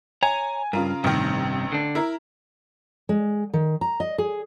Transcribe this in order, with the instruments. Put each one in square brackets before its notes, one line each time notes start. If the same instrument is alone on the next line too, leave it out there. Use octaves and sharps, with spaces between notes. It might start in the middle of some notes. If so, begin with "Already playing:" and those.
[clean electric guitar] C#5 A#5 [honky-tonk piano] G#5
[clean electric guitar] G2 [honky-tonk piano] C#3 F4 A#4
[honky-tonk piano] A1 D#3 [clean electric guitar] G2 C3
[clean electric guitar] D3 D4
[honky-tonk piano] E4 A#4
[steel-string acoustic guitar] G#3
D#3
A#5
D#5
G#4